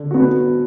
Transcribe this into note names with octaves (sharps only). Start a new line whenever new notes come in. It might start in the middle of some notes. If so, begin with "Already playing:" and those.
Already playing: D3
B3 F#4